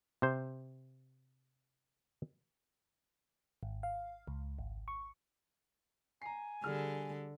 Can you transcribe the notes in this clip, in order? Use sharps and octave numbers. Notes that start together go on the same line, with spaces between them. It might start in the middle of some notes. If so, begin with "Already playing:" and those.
C3 C5
G#1
F5
C#2
G#1
C#6
G#5 A#5 C7
D3 G3 G#4 F6